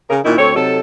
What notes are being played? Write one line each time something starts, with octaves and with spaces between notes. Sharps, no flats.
C#3 A#4
A#2 D#3 C#4 D#4 E4
D2 C4 A4 C#5
C3 F#3 D#4 A4